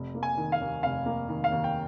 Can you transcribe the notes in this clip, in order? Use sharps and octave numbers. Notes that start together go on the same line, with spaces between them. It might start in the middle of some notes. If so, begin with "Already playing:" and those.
Already playing: F1
A#3
G#5
D#3
F5
D#2
F1 F5
A#3
D#3
F5
D#2
G5